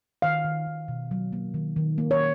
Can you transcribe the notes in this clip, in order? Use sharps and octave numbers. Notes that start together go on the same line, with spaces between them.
D#3 F5
D#3
D#3
B2
F#3
A#3
D#3
D#3
A#3
C#5